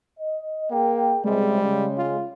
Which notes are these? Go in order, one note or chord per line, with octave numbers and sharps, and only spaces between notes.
D#5
A#3 G#4 A#4 G5
C#2 C3 G3 G#3
C#3
F4